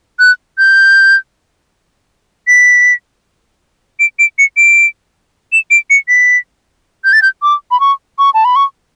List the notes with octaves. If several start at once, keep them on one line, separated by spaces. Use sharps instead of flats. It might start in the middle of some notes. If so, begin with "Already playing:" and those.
F#6
G6
B6
D7
D7
C#7
D7
E7
D7
C#7
B6
G6
A6
G6
D6
B5
C#6
C#6
A5
B5
C#6